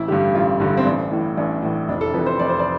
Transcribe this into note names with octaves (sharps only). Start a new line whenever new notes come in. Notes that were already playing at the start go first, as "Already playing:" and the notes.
Already playing: A1 E4
G2 D3 G4
A1 F4
G2 D3
C4
A1 D4
A2 E3
A1 D4
A2 E3
F1 D4
A4
F2 E3 B4
C5
F1 D5
C5
D5